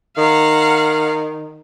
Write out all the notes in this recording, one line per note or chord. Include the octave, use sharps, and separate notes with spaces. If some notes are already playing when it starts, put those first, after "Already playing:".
D#3 F5 F#5 A#5